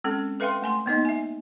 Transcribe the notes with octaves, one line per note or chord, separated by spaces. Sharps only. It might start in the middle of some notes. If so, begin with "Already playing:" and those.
G#3 C4 C#4 A4
A4 B4 E5 F5 G5 C6
A3 G#5 C6
A#3 B3 D#4 D#5
E5 G#5